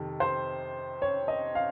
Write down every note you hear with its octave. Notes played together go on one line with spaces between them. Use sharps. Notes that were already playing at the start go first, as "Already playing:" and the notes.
Already playing: F2 C3 D#3
C5
C#5
D#5
F5